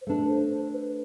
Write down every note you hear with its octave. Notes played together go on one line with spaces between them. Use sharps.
C5
A3 D4 A4 B4
C5
C5
B4